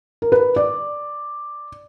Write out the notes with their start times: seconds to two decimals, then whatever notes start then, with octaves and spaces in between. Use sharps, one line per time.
0.22 A#4
0.32 B4
0.56 D5